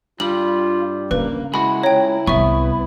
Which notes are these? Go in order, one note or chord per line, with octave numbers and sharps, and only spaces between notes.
G2 G3 F4 F#7
C#3 A#3 B4
G#3 E4 F#4 B5
C#2 C#5 G5 A#5
C2 B3 E5 C#6